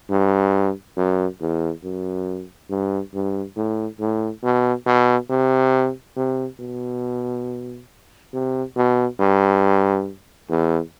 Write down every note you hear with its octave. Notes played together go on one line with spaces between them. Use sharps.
G2
F#2
E2
F#2
G2
G2
A2
A2
B2
B2
C3
C3
B2
C3
B2
G2
E2